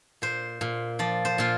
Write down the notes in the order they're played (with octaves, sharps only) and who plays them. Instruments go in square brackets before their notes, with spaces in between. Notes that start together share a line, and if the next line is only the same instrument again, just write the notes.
[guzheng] A#2 C5
A#2
F3 D5
C5
A#2 F4